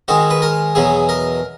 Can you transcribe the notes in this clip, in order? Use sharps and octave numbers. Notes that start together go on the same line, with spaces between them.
G#2 D#3 G#3 F#4
B4
A#4
E2 B2 F#3 G#4
A#4